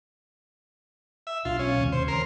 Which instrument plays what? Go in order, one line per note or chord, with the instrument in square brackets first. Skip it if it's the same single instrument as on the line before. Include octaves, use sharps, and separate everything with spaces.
[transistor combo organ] E5
[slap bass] B1 D4 [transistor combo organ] F4
[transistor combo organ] C#4
[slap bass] D#2 C3 G#3
[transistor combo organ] C5
[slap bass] D#2 C#3 E3 [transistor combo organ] A#4 C6